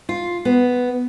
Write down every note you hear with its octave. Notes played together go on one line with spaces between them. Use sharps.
F4
B3